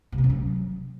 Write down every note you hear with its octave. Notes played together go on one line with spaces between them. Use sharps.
C3
B3
C#4
F#3